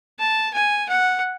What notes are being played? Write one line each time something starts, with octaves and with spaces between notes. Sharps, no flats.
A5
G#5
F#5